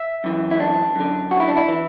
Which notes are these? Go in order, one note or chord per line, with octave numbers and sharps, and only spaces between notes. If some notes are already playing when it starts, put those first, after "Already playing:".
Already playing: E5
F#2 E3
E4
D4
F#2 D3
F#4
E4
D4
E4
E3